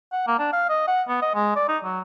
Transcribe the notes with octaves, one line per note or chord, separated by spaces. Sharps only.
F#5
A#3
D4
F5
D#5
F#5
B3
D#5
G#3
D5
D#4
F#3